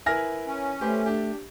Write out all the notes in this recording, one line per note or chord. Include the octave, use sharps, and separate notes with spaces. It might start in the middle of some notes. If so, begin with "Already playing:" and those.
E4 A#4 B4 G#5 F6 A#6
C#4
A3 G4 B4 C5
D4 G4